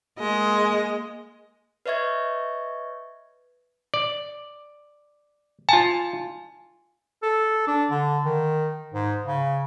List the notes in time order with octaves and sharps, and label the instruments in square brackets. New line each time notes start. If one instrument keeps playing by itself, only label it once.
[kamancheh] G#3 [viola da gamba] A#3 D#5
[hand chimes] B4 C#5 D#5 E5 C#6 G#6
[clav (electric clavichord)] D5
[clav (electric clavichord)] F4 A5 [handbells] G#5
[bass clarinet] A4
D4
D3
D#3
G#2
C#3